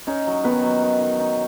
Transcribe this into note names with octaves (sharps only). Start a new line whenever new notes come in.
C#4 D#4 C#5
F#3
D#3 B3 B4
F#3
D#3
D#3
D#4